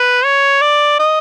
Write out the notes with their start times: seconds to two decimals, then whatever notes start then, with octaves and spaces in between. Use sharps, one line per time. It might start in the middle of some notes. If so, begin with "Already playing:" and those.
Already playing: B4
0.25 C#5
0.61 D5
0.99 D#5